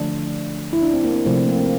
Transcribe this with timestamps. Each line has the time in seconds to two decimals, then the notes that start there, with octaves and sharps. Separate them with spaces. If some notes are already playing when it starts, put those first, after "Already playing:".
Already playing: D3 F3 A3 D4
0.73 E4
0.82 D4
0.93 C4
1.04 A#3
1.15 C4
1.25 C3 F3 A3 C4
1.37 C4
1.47 A#3
1.58 C4